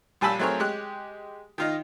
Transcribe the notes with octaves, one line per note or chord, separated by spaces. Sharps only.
A#1 G3 G#5 A5 B5 E6
F#3 A3 C4 G#4 A#4 C#5
G#3 G4 F#6
D#3 F4 D#5